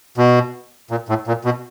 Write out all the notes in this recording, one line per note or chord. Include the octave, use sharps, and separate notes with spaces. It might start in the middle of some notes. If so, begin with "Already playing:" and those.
B2
A#2
A2
A#2
B2